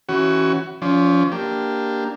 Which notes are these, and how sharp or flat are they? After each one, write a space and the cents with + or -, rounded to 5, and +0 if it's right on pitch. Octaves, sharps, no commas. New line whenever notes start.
E3 +0 C#4 -5 F#4 +20
F3 +5 C#4 +30 D5 +0
A#3 +0 D4 +0 G4 +0